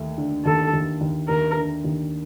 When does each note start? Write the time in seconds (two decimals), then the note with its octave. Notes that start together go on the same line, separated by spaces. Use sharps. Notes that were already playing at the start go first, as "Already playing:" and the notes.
Already playing: D#2 A3
0.18 D3
0.45 D#2 A4
0.73 D#2
1.01 D#2
1.29 D#2 A#4
1.57 D3
1.85 D#2